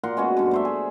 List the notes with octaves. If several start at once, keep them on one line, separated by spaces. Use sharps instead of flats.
A#2 A#4 F#5 C6
G#3 B3 C#4 F#4
G2 D3
A3 C5 E5
G#4